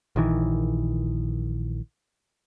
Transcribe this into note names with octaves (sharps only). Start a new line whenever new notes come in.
A#1 D#3 E3